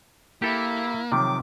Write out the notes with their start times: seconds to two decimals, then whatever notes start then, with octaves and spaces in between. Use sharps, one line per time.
0.42 A#3 E4 G4 A4
1.12 C3 D#3 F3 F#3 D6